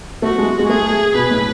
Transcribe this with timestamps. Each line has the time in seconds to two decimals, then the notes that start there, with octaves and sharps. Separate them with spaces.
0.22 A3 F#4
0.38 G#3
0.59 G#3
0.69 A3 G#4
1.15 B2 B4
1.31 A2